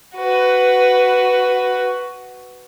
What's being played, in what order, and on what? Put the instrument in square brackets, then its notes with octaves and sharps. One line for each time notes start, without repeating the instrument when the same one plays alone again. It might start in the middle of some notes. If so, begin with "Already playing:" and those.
[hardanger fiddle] F#4 B4